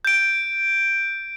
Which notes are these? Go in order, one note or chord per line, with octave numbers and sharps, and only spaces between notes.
G6 D7